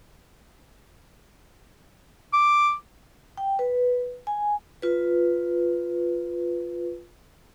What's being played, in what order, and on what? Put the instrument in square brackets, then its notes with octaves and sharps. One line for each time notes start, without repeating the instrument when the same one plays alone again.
[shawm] D6
[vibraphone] G5
B4
G#5
F4 B4